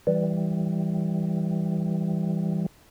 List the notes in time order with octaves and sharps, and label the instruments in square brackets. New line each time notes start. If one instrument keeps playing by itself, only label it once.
[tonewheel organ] E3 G3